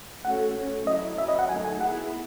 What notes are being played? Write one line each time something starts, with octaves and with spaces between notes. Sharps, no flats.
A3 C#4 F#4 A4 F#5
A3 C#4 F#4
F#3 A3 E4 D#5
C#4 F#4 B4 E5
D#5
F#5
D#3 F#3 A3 D#4 G#5
G#5
B3 E4 G#4 F#5